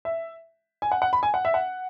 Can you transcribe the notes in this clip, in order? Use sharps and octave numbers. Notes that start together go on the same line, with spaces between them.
E5
G#5
F#5
F#5
B5
G#5
F#5
E5
F#5